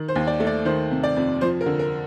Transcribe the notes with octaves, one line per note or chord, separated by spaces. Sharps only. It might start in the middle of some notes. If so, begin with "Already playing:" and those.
Already playing: D#3
C5
D#2
D5
A3
D5
D#3 C5
C3
D5
F2
F3 C5
A#4
D3
A#4